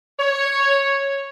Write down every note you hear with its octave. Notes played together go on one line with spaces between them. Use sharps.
C#5